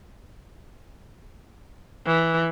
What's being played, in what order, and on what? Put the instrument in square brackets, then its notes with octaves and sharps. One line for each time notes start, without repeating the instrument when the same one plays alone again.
[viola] E3